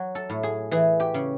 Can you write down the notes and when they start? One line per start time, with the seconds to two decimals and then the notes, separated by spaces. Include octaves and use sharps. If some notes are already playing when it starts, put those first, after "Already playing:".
Already playing: F#3
0.15 A4
0.30 A2
0.43 G#4
0.71 E3 G#4
1.00 G4
1.14 C#3